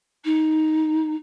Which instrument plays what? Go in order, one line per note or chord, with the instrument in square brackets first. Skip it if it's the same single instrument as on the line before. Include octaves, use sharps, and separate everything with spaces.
[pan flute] D#4